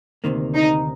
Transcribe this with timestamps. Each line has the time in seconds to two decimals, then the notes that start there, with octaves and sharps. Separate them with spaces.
0.24 D2 C3 D#3 A#3
0.55 D#4